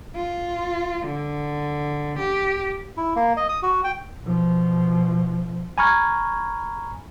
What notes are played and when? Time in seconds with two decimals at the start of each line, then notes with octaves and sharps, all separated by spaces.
0.15 F4
1.06 D3
2.19 G4
2.97 E4
3.16 A#3
3.37 D#5
3.49 D#6
3.63 F#4
3.84 G5
4.23 B2 F3
5.78 G#5 A#5 B5 C#6 F6 G#6